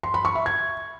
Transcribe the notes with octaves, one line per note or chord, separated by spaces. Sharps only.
C6
B5
C#6
E5
G#6